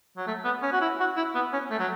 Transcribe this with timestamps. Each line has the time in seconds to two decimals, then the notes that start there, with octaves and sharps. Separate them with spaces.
0.17 F#3
0.27 A3
0.45 B3
0.63 C#4
0.72 F#4
0.81 E4
1.00 F#4
1.17 E4
1.35 B3
1.53 C#4
1.71 A3
1.79 F#3